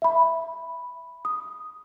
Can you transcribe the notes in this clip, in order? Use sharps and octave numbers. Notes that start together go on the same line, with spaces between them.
E5 B5
D#6